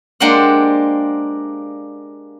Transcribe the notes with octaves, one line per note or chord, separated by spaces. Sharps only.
G#3 A#3 D4 G4 C5 F#5